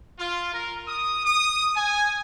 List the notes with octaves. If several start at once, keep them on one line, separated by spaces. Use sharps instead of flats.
F4
A#4
D#6
D#6
G#5